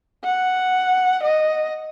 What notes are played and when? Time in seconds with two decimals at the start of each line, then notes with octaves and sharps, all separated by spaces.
0.24 F#5
1.23 D#5